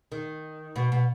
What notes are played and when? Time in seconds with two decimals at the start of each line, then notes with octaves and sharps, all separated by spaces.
0.12 D#3
0.76 B2
0.92 B2